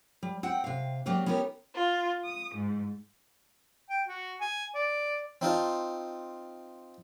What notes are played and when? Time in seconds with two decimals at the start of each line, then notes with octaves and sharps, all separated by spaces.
0.23 G3
0.43 C4 F#5 G5
0.64 C3 F5
1.06 C#3 F#3 A#3 C4 G4 D5
1.26 B3 C#4 D#4 G4 A4 A#4
1.77 F4
2.26 D#6
2.55 G#2
3.89 G5
4.08 F#4
4.40 G#5
4.75 D5
5.41 C4 D#4 F4 A5